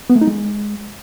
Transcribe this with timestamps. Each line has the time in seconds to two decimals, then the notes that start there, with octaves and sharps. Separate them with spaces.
0.10 B3
0.16 A3
0.21 D#4
0.27 G#3